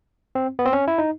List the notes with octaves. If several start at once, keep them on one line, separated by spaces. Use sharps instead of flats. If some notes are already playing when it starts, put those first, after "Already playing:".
C4
B3
C4
C#4
E4
D#4